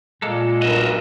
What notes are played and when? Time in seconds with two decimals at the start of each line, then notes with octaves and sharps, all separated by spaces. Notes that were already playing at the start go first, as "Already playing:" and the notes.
0.22 A#2 G#3 A#3 A4
0.62 B1 G2 F#4 A#4 D#5 E5